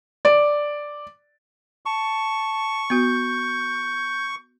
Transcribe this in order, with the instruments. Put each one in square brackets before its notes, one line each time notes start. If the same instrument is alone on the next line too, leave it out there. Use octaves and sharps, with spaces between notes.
[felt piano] D5
[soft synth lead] A5 [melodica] C#6
[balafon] B3 F#4 [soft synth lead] G6